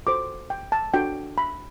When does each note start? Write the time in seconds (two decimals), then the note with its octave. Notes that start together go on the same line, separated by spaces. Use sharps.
0.06 F#4 A4 C5 D6
0.50 G5
0.72 A5
0.94 D4 F#4 A4 G5
1.38 B5